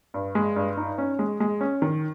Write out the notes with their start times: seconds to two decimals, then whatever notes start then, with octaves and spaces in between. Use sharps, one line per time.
0.14 G2
0.35 G#3
0.56 G2
0.77 D#4
0.98 C#4
1.19 G#3
1.40 G#3
1.61 C#4
1.82 D#3